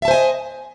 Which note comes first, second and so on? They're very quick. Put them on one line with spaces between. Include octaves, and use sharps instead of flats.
E5 A5 C5 G#5 D#5